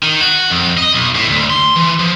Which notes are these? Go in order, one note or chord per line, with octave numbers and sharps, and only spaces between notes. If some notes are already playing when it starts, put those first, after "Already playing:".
D#3
F#4
F2
D#5
B1
A2
D2
C6
E3
F3